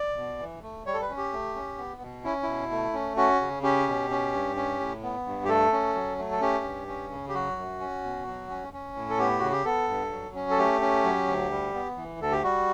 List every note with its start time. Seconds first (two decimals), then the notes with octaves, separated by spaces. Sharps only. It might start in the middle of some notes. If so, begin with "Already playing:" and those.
Already playing: D5
0.17 B2
0.39 E3
0.62 A3
0.86 G3 C#5
0.94 A4
1.02 B4
1.09 C#4
1.17 G4
1.33 A3
1.55 C#4
1.78 B3
2.02 B2
2.24 C#4 E4
2.43 B2 E4
2.71 A3
2.93 C#4
3.17 C#4 F#4
3.41 C#3
3.63 C#4 G4
3.87 B2
4.10 C#4
4.33 G2
4.56 C#4
4.80 A2
5.03 B3
5.26 G2
5.45 G4
5.48 A3 A4
5.72 C#4
5.95 F#3
6.19 A3
6.31 A4
6.41 C#4 G4
6.64 G2
6.87 C#4
7.11 C#3
7.29 G4
7.34 F#3 F#4
7.57 F#2
7.80 C#4
8.04 B2
8.27 F#3
8.50 C#4
8.73 C#4
8.96 A2
9.10 A4
9.19 B3 G4
9.39 C#3 F#4
9.52 G4
9.65 B3 A4
9.89 G2
10.11 F#3
10.35 C#4
10.50 A4
10.58 A3 G4
10.81 C#4
11.04 F#3
11.27 D2
11.51 G3
11.74 B3
11.96 E3
12.20 D2 A4
12.32 G4
12.44 G3 F#4